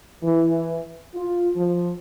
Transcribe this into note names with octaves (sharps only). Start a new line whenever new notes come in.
E3
F4
F3